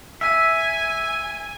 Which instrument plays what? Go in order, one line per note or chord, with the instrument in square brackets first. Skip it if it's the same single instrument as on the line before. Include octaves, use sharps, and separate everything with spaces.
[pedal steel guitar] E5 [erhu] G#5